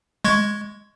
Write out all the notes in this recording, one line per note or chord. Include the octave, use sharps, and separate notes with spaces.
G#3 C#6 G#6